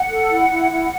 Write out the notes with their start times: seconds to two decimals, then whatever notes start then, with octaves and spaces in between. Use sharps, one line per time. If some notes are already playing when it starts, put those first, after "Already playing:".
Already playing: F#5
0.09 A4
0.29 E4
0.49 E4
0.70 E4